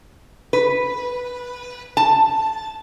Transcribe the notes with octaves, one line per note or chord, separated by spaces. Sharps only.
B4
A5